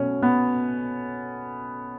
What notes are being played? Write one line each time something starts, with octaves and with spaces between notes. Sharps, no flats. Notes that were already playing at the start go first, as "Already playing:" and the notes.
Already playing: B2 F#3 A3 C#4
B3